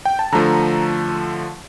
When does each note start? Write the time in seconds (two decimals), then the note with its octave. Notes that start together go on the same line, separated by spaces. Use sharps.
0.05 G5
0.19 A5
0.32 D3 F3 A3 A#5